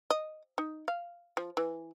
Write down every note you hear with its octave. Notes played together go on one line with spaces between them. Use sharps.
D#5
D#4
F5
F3
E3